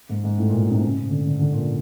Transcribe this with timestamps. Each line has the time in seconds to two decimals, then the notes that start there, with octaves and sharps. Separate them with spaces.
0.09 G#2
0.24 G#2
0.38 A2
0.49 A#2
0.59 B2
0.71 C3
0.81 C#3
0.96 C#3
1.09 D3
1.25 D3
1.39 D3
1.53 A#2